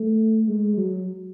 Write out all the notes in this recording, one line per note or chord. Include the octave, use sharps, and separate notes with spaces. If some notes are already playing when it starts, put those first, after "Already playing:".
Already playing: A3
G#3
F#3